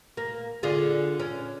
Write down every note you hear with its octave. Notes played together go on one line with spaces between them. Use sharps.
A#3
D3 F4 G#4
C#4